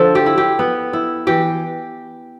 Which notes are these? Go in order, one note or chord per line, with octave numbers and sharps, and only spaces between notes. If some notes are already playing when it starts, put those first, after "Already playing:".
Already playing: D3 F3 A4
G4
E4
G4
B3
E4
E3 G4